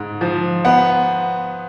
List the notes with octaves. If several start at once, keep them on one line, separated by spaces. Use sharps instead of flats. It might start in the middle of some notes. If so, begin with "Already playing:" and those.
Already playing: G#2
F3
B3 F#5